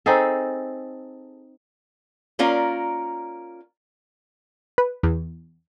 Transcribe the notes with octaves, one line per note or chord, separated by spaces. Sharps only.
C4 D#4 G#4 A4
A#3 C#4 F4 A#4 D5
B4
E2